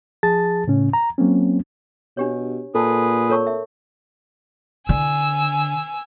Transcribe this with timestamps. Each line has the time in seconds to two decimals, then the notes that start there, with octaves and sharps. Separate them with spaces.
0.23 F3 G#4 A5 A6
0.68 A2 C#3 C#4
0.93 A#5
1.18 F#3 A#3 C4 C#4
2.17 B2 D4 G4 C#5
2.75 A#2 G#4 A4 B4
3.30 A4 A#4 C#5 C#6
3.47 E5
4.89 D3 G#5 E6